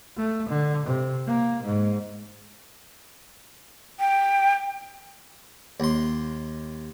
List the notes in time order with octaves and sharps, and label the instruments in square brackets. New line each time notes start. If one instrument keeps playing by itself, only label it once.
[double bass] A3
D3
C3
A#3
G#2
[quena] G5
[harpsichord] D#2 C6